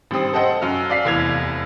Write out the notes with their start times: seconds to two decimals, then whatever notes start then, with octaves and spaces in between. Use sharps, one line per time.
0.11 G#1 G3 C4 D#6
0.33 A4 C5 D#5 F#5 G5
0.61 F#2 F#4 F6
0.90 D5 F5 B6 C7
1.05 F1 E2 G#6 F7